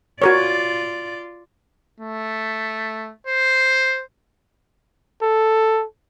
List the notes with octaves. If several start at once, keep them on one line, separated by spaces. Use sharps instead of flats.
F4 F#4 A#4 C#5 D5
A3
C5
A4